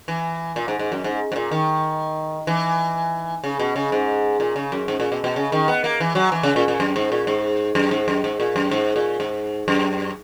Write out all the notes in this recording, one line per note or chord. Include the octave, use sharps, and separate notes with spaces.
E3
A#2
G#2
G#2
F#2
G#2
G#2
A#2
D#3
E3
C#3
B2
C#3
G#2
A#2
C#3
F#2
G#2
A#2
B2
B2
C#3
D#3
B3
A#3
E3
F#3
E3
C#3
A#2
A#2
F#2
G#2
A#2
G#2
F#2
G#2
F#2
G#2
A#2
F#2
G#2
A#2
G#2
F#2